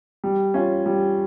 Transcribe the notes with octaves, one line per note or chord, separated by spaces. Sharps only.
G3
C#4 F4
G3